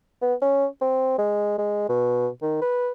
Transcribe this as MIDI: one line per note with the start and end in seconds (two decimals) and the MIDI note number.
0.22 0.34 59
0.42 0.66 61
0.81 1.14 60
1.18 1.58 56
1.58 1.87 56
1.89 2.28 47
2.42 2.58 51
2.61 2.92 71